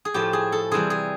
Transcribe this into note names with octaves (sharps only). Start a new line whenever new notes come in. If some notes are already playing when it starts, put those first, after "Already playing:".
G#4
A2 F3 A3 G4
G#4
A4
C3 E3 G3 G#4
G#4